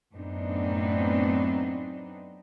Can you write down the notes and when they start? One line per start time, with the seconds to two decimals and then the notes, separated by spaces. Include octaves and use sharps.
0.14 F#2 A2 B3 C4 D4 D#4